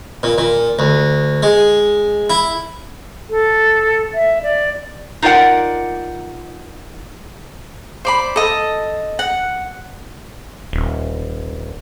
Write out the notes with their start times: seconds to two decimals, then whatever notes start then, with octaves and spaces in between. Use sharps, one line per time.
0.23 A#2
0.38 A#2
0.79 D2
1.43 G#3
2.30 E4
3.30 A4
4.14 E5
4.43 D5
5.22 D#4 F4 A#4 D5 F#5
8.05 C5 D5 B5
8.36 A4 D#5
9.19 F#5
10.73 D#1